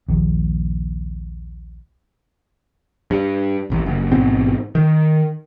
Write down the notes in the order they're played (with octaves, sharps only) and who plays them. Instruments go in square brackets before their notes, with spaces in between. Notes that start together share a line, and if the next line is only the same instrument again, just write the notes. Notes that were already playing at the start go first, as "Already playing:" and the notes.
[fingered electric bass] A#1 D#2
[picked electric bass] G2
D#1 A1
F#1
A1 G#2 B2 C4
D#3